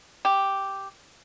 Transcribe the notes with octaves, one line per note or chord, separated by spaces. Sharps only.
G4